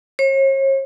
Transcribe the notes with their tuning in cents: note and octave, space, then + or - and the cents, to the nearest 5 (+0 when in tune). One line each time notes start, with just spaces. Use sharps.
C#5 -40